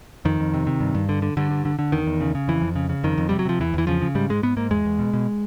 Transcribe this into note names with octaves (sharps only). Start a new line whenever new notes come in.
F2 D#3
F2
C3
C3
G2
G2
D3
D3
G2 D3
G2
D3
D3
E2 D#3
E2
C#3
C#3
F2 E3
F2
C#3
C#3
F2 D#3
F2
C3 G3
F#3
C3 F3
E2 E3
E2 E3
C#3 F3
C#3
G#2 G3
G#2 G#3
G#2 B3
G#2 A#3
E2 G#3
E2
B2
B2